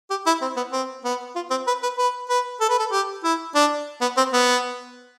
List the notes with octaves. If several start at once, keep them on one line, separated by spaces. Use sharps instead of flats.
G4
E4
C4
B3
C4
B3
F4
C4
B4
B4
B4
B4
A4
B4
A4
G4
E4
D4
B3
C4
B3